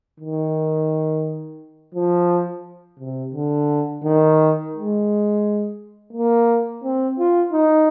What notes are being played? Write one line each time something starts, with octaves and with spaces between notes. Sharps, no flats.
D#3
F3
C3
D3
D#3
G#3
A#3
C4
F4
D#4